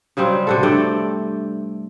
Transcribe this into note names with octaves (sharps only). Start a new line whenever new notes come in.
C#3 F#3 G3 C4
C3 F#4 A4
G2 A3 D5 G5